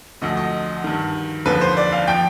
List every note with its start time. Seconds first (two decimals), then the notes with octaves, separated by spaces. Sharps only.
0.21 D2 D3 F3 D#5
0.37 D#5
0.84 G2 D#3
1.46 D#2 D3 F3 B4
1.61 C5
1.77 D5
1.93 F5
2.07 F3 G5